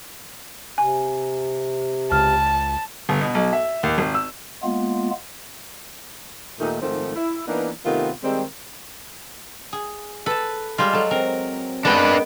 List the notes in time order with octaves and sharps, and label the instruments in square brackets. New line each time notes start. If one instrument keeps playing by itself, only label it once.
[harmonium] C3 [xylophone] G#5
[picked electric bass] C#2 [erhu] A5 [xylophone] F6
[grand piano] G1
B2
B1
E5
D#2
G#1
E6
[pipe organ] G#3 A#3 B3 F4
[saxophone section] D#2 A#2 A3 D#4
G#2 D#3 F3 A3 C4
E4
E3 A#3 B3 D4 D#4
C3 D#3 A3 B3 F4
D#3 G3 G#3 C4
[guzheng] G#4
[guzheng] A4 A5 [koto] B4
[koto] G3 F4 [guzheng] G#3
[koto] F#3 A4
[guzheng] C4 [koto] A#4
[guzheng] G#3 A#4 [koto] B3 G5 [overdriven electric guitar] D4 B4